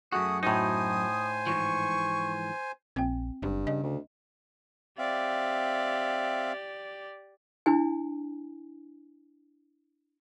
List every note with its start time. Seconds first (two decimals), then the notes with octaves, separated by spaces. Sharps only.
0.12 F#2 A3 F#4 G#4 F#5 D#6
0.43 A2 D#4 C5 G#5 D#6
1.47 G#2 E3 F3 C#6
2.96 A#1 C4 G5
3.42 F#1 G2
3.67 C#3 D#5
3.83 D2
4.98 C4 G4 D5 E5 F5
7.66 D4 E4 G#5